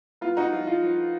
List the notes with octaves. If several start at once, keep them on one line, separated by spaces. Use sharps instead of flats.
B3 F4
D#4 F#4
F3 F4
F4
F3